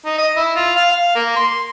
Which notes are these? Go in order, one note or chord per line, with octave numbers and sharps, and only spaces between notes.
D#4
D#5
E4
F4
F5
F5
A#3
C6